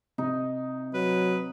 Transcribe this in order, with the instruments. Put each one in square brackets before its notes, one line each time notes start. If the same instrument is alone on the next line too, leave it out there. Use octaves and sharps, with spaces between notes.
[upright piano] C3 [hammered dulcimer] D#4
[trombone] F#3 [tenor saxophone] B4